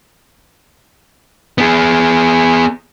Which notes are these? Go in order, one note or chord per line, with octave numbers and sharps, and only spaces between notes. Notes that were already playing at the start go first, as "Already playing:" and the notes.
B3 G#4